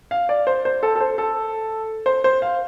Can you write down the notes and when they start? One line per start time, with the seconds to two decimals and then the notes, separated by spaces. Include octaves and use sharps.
0.11 F5
0.29 D5
0.47 C5
0.65 C5
0.83 A4
0.96 A4
1.01 C5
1.18 A4
2.06 C5
2.24 C5
2.42 F5